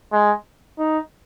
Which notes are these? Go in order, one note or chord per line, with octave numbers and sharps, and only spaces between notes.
G#3
D#4